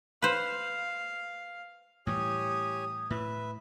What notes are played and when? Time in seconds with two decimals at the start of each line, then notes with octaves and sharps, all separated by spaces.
0.22 B4 C5 F5
2.07 A2 E3 G3 G4 C#5 G#5 D#6
3.10 A2 B4 E5